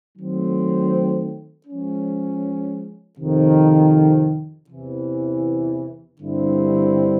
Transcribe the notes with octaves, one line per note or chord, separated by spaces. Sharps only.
D#3 F#3 A3 C4
F3 G#3 C#4
F2 C3 D#3
E2 C3 E3
G2 D3 G3 C4 E4